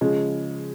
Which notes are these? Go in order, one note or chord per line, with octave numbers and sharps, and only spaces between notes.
C#3 F3 G#3